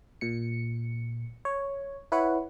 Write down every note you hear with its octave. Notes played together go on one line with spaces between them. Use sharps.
A#2 C#7
C#5
E4 B4 C#5 F#5